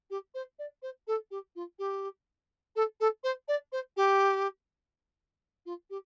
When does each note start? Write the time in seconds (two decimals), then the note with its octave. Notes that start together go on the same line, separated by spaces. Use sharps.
0.10 G4
0.34 C5
0.58 D5
0.82 C5
1.07 A4
1.30 G4
1.55 F4
1.78 G4
2.75 A4
3.00 A4
3.23 C5
3.48 D5
3.72 C5
3.96 G4
5.65 F4
5.90 G4